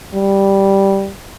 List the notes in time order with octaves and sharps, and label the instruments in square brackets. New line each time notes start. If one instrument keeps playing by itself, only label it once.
[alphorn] G3